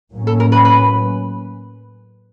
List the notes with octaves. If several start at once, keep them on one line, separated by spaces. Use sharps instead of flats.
A2 F#3 A#3 C#4
A4
A#4
B4
B4